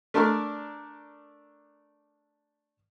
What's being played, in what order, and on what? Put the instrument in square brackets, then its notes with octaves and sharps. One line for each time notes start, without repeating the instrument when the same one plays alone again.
[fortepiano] A3 D4 A#4 D5 F6